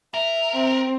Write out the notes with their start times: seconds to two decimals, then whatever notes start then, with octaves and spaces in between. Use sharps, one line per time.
0.14 A#4 E5
0.52 C4